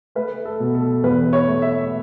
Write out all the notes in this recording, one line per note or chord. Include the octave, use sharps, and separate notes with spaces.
A3 B4
A4
B2
A4
E2 B4
C#5
A3
E5